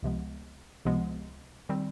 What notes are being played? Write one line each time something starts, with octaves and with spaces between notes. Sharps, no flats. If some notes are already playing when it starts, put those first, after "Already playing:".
C#2 C3 F3 G#3 B3
C#2 C3 F3 G#3 B3
D#3 G3 C4